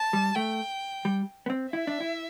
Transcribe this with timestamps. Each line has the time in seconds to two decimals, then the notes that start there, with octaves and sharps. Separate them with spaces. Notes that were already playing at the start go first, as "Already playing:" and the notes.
Already playing: A5
0.13 G3
0.36 A3 G5
1.05 G3
1.46 B3
1.50 C4
1.73 E4 E5
1.87 D4
2.00 E4